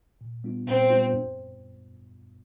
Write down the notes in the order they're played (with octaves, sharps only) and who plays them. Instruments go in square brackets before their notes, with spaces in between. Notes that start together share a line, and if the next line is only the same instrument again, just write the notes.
[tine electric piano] A#2
G3 B3 D4 F4
[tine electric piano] A#2 [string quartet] C4
[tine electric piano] G3 B3 D4 F4
F#2